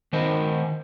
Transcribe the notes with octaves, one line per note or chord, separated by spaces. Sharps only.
D#3 C5 D#5